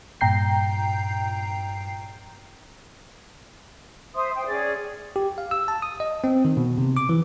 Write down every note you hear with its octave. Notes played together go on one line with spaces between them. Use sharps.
G2 A#2 G5 A#5 G6 C7
C5 E5 C6 D#6
C5 G5
C#4 G#4 D5
G4
F5
E6
A5
D#6
D#5
C4
D#3
B2
C3
D6
E3